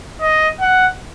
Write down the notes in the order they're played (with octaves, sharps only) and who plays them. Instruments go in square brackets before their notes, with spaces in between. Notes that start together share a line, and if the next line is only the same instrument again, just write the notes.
[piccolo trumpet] D#5
F#5